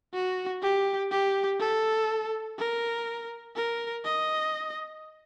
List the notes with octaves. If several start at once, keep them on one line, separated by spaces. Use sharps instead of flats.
F#4
G4
G4
A4
A#4
A#4
D#5